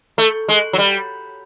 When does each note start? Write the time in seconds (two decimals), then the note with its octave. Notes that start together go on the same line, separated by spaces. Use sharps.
0.18 A3
0.49 G#3
0.73 F#3
0.78 G3